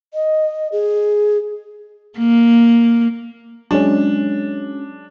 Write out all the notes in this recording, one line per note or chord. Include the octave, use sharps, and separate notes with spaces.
D#5
G#4
A#3
F#3 G#3 C#4 D4